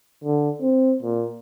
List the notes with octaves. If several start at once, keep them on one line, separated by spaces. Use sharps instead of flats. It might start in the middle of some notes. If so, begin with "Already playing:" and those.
D3
C4
A#2